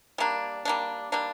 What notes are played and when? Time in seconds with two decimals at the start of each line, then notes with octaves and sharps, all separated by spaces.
0.18 G3 A#3 D4
0.65 G3 A#3 D4
1.12 G3 A#3 D4